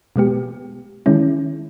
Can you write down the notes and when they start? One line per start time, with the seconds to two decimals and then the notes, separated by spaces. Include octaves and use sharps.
0.16 B2 G#3 B3 G4
1.06 D#3 G#3 C#4 E4